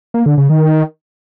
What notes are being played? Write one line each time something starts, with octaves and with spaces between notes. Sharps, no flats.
A#3
D3
C#3
D#3